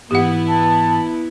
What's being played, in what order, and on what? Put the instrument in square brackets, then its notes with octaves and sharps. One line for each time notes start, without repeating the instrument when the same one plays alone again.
[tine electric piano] G#1 G#2 E3 [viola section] B3 E4 [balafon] G4 F#5
[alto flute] A5